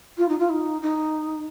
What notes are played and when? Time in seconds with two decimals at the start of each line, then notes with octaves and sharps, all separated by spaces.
0.18 F4
0.28 D#4
0.39 F4
0.49 D#4
0.82 D#4